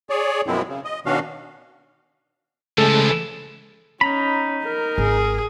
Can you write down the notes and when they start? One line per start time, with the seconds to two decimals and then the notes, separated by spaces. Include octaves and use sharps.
0.10 G#4 C#5 D5
0.47 F#2 B2 F3 G#3 C4 E4
0.68 C#3
0.85 D#5
1.06 B2 D#3 C#4 D4 F#4 F5
2.78 C#3 E3 F3 G#3 A3 A4
4.01 C#4 D#4 A#5 B5
4.64 A#4
4.98 G#1 G#4